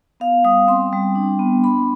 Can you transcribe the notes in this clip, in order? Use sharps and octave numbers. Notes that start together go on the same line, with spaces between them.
B3 F5
G3 D#6
C4 C6
G3
D4
B3
D4 B5